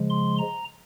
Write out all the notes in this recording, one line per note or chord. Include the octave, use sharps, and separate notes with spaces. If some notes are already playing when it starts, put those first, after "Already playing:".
Already playing: C#3 F3 G#3
C6
A#5